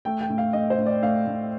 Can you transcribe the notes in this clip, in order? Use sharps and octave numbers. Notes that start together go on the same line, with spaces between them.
A3 G5
G5
A2
F5
A3 D#5
C5
A2
D5
A3 F5
A2